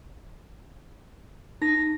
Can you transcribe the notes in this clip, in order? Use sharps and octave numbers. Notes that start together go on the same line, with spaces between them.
D#4 A#6